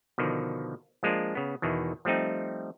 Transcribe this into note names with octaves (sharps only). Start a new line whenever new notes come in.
B2 D3 D#3 F3
F3 G#3 A#3 D4 F4
C#3 B3
E2 B2 D#3 E3
F3 G3 A3 C4 D#4